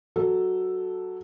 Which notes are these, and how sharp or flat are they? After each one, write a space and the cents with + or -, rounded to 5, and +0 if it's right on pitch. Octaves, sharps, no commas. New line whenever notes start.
F#3 +0 A4 +0